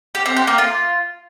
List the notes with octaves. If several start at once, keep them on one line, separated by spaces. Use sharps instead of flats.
G4
C4
G4
A#3
F4